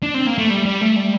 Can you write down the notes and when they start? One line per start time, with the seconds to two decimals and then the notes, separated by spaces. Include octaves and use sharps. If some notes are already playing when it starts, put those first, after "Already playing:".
0.03 D4
0.14 C4
0.26 A#3
0.38 A3
0.50 G3
0.65 G3
0.81 A3
0.96 G3